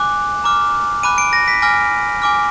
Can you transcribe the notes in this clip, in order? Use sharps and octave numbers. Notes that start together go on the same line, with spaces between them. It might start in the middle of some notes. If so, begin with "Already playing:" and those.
Already playing: G#5 D6 F#6
A#5 D6 F6
G#5 B5 D6 F#6 D#7
D7
A#6
B6
G#5 D6 F6 A#6
G#5 D6 F6